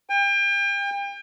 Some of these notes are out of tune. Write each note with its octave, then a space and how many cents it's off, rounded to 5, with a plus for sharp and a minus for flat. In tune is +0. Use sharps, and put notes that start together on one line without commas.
G5 +35